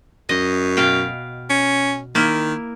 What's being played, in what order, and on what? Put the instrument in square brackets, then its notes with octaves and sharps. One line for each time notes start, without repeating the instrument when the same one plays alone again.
[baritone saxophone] F#2 [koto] D#5
[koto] B2 F5 G5
[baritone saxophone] C#4
[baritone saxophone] D#3 [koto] A#3 E4